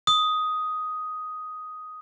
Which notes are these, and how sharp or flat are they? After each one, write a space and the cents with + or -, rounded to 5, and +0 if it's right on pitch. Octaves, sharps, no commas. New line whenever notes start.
D#6 +5